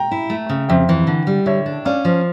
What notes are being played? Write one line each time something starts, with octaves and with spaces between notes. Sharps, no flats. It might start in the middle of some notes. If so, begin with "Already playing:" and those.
Already playing: G5 A#5
E4
A3
C#3
F2 E5 G5
E3
D3
G3
D3 C#5 E5
D4
C#4 D5 F5
F3